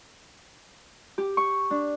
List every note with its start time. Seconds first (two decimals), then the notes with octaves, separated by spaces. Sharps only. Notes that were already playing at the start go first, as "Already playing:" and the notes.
1.18 G4
1.37 C#6
1.70 D4